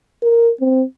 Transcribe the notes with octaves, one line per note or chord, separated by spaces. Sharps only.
A#4
C4